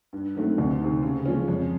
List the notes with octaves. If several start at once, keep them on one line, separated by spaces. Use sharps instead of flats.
G2
D#3 F#3 A3 C4
D2
C3 D#3
C#3
F3 G#3 C#4
F2